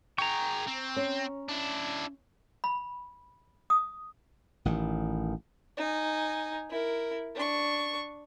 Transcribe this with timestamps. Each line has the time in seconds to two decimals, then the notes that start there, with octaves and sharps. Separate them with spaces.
0.18 G#4 G5 A#5 C#6
0.68 C4
0.96 C#4
1.49 D4 E4
2.64 B5
3.70 D#6
4.65 A1 D#3
5.77 D#4 G#5
6.70 E4 A#4
7.35 D4 C#6